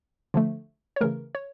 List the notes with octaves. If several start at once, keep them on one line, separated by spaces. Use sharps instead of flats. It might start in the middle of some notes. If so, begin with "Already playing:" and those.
D3 F3 A3
C#5
C#3 E3 A3 A#4
C#5